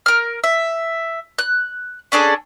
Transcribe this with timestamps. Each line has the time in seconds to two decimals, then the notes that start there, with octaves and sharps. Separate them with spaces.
0.06 A#4 F6
0.44 E5
1.38 F#6
2.12 C#4 D4 G#4 A4